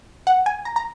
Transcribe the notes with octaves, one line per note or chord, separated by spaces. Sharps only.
F#5
G#5
A#5
A#5